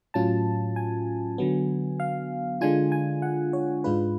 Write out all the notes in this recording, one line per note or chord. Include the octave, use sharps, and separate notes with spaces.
A2 F#3 C#4 F4 A5
G#5
D3 F#3 B3
F5
D3 G#3 D4 F4 G#5
G#5
F#5
C#5
G#2 G#3 D4 F4 B4